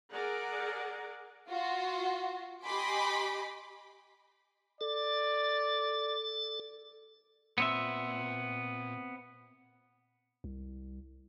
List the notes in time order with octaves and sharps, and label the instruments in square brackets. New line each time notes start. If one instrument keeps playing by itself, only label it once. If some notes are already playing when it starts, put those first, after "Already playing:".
[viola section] G#4 A#4 D5 F#5
[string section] F4 F#4
G4 D#5 G#5 B5 C6 D6
[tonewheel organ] A4 [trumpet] D5
[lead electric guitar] A#2 [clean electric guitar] B3 C4 E5
[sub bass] C2